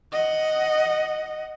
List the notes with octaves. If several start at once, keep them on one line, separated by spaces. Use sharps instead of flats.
D#5 F#5